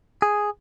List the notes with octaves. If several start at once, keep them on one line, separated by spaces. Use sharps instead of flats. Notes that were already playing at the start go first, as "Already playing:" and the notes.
G#4